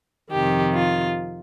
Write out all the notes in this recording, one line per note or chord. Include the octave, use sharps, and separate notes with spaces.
F2 C3 D#3 G4
F4